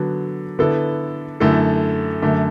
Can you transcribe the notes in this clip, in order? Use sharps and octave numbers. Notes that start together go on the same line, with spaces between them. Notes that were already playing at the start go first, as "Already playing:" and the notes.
Already playing: D3 F#3 B3
D3 B3 E4 A4
F#2 D3 A3 E4 A4
F#2 D3 A3